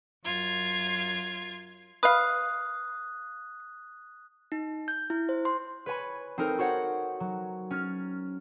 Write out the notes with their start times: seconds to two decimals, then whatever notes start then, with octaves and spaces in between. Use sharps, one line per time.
0.25 F#2 F4 G#6
2.03 B4 F5 D#6 F#6
4.52 D#4
4.88 G6
5.10 E4
5.29 C5
5.45 C6
5.86 B4 C#5 G#5 B5
6.38 C4 D#4 A4 A#4 C5
6.58 F#4 C5 C#5 F#5
7.20 F#3
7.71 C#4 F6 A6